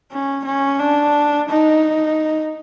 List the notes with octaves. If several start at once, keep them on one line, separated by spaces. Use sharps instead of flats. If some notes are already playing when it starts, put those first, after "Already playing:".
C#4
C#4
D4
D#4